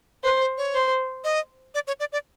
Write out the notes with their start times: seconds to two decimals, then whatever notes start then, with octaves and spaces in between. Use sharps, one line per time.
0.24 B4 C5
0.40 C5
0.58 C#5
0.74 C5
1.24 D#5
1.74 D5
1.87 C#5
2.00 D5
2.12 D5